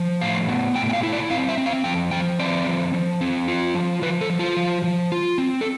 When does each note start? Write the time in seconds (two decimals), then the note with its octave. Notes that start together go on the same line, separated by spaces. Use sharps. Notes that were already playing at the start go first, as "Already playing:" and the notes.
Already playing: F3
0.21 A2 F5
0.49 B3
0.76 A2 G5
0.90 G5
0.93 F5
1.03 E4
1.13 D5
1.30 C4 F5
1.49 E5
1.58 C4
1.66 F5
1.84 F3 G5
2.11 F3 G5
2.39 C4 D5
2.67 F3
2.94 F3
3.21 C4
3.48 F4
3.75 F3
4.02 F3 B4
4.21 A4
4.30 F3
4.39 F4
4.57 F3
4.84 F3
5.12 F4
5.38 C4
5.61 A4